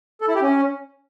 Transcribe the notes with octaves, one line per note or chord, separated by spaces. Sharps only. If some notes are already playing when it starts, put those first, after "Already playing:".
A4
E4
G4
C#4